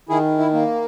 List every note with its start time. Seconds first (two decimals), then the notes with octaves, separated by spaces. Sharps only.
0.09 D#3 E4 G#4
0.38 E4
0.53 A#3